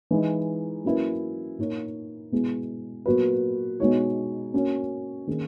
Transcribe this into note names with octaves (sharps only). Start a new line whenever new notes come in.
E3 G#3 D#4
F#3 A#3 C#4 E4 B4
A#2 A#3 D#4 A#4 C#5
B2 G#3 B3 E4 G#4
A#2 F#3 B3 F#4 B4
B2 G#3 D#4 F#4 C#5
A#3 C#4 F#4 C#5
D#3 A#3 C#4 G#4